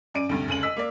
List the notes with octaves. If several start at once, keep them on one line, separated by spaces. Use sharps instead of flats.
F#2 D5 D7 D#7
D2 G2 C3
F1 C#2 D#7 F#7
D#5 E6 B6
A#3 D5